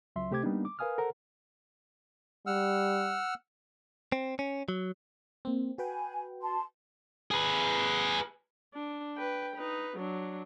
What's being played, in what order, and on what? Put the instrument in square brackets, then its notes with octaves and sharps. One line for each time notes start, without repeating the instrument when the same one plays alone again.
[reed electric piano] C#2 F#3 E5 C6
C3 A3 G4 C5 D6 G#6
G3 A#3 B3 D4 D#4
D6
A#4 B4 F5 G#5 D#6 F6
A4 A#4 C5 F#5 A#5
[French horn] G3 [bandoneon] F#5 E6 F6
[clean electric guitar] C4
C#4
F#3
[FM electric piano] A#3 C4
[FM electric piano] F#4 B4 G5 [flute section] G#5
[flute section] A5 C6
[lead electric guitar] G#4 B4
[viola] D4
B4 G5
D#4 B4
F#3 D4